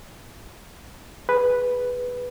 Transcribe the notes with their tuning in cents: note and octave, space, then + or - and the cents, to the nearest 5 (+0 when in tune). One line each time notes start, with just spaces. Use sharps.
G#4 +0 B4 +0